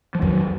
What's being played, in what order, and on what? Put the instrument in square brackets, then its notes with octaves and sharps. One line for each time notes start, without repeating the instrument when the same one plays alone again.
[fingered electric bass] F3
[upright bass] F2 [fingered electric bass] D#3 F#3